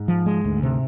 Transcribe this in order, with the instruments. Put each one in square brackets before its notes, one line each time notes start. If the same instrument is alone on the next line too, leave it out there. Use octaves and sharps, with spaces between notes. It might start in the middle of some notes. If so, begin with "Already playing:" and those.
Already playing: [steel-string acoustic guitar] G#2
[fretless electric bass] F3
G#3
D2
C3